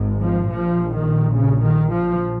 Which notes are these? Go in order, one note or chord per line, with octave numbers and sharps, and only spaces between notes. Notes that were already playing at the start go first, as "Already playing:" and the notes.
Already playing: G#1 G#2
F3
A#1 A#2 F3
D#3
C#3
D#3
F3